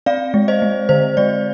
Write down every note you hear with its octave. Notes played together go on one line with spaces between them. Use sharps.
C4 D5 F5
G#3
C5 D#5
G#3
D3 C5
G#3 D5